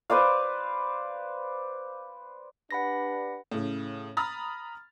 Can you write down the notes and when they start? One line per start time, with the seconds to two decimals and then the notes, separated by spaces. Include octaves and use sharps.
0.10 B4 C5 D5 F5
2.71 D4 G4 B4 F#5 B5 A#6
3.51 A2 C#3
4.17 A#5 B5 D#6 F6 A6